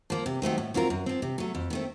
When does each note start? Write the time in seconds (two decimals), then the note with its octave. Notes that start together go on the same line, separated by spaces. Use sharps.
0.10 F3 A#3
0.26 C3
0.42 D#3 F#3 A3 C4
0.58 A2
0.74 F#3 C4 F4 A#4
0.90 F#2
1.06 F3 C4
1.22 C3
1.38 F#3 A3
1.55 F2
1.70 D#3 A3 C4